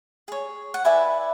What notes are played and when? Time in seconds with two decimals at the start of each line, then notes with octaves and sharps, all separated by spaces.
0.28 G#4 C#5
0.74 F#5
0.85 E4 B4 D5 E5 G#5